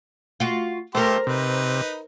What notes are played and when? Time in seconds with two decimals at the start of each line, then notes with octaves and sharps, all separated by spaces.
0.40 F4 F#4
0.95 A3 G4 A#4 C5 C6
1.27 C3 D#4 B4